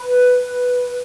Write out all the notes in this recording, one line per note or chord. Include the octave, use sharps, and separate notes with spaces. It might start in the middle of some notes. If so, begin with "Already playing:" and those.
Already playing: B4